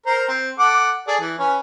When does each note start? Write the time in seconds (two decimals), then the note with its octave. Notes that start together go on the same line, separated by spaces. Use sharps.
0.06 A#4 C5 A#5
0.28 C4
0.59 A4 F#5 D6
1.08 G#4 A4 D5
1.20 E3
1.38 C#4 B4 G#5